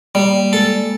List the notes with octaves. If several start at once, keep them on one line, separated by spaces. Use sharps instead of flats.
G3 A#3
G#3 A4